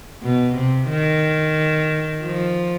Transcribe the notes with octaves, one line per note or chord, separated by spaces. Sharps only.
B2
C3
D#3
F3